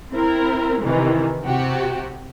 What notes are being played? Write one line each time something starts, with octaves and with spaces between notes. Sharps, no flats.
C4 E4 A#4
C3 D#3 E3
C3 F#4 G4